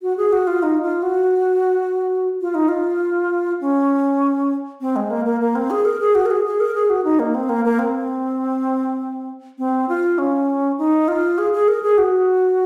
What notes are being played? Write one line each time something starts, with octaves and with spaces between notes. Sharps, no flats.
F#4
G#4
F#4
F4
D#4
F4
F#4
F4
D#4
F4
C#4
C4
G#3
A#3
A#3
A#3
C4
G#4
A#4
G#4
F#4
A#4
G#4
G#4
A#4
G#4
F#4
D#4
A#3
C4
A#3
A#3
C4
C4
F4
C#4
D#4
F4
G#4
G#4
A#4
G#4
F#4